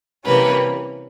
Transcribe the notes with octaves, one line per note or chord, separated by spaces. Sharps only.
C3 E3 G3 A#3 C#4 B4